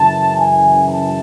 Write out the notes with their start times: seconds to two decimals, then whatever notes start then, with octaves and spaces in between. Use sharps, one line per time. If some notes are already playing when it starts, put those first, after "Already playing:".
Already playing: F#2 C#3 E3 A5
0.36 G#5
0.88 A5